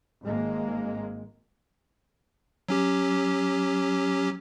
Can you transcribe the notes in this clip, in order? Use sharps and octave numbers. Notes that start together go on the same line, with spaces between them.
G#1 G#3 A#3
F#3 C#4 G4